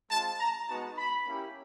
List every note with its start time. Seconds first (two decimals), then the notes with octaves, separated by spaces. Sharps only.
0.10 G#3 C4 F4 A5
0.39 A#5
0.67 G#3 B3 D#4 F#4 A5
0.97 B5
1.26 A#3 C#4 E4 G4